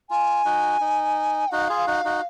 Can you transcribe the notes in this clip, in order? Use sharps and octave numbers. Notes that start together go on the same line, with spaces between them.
F4 G#5
D#4 F#4
D#4
D#4 F#4 F5
F4 G#4
D#4 F#4
D#4 F#4